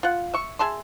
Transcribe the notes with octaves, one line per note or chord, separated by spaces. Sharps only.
F4 F#5
E5 C#6
G#4 E5 A5 C6